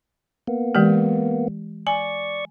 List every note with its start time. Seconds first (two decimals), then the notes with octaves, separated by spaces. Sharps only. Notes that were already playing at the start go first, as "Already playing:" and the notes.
0.47 A#3 B3
0.75 E3 G#3 G4
1.87 D5 G#5 C#6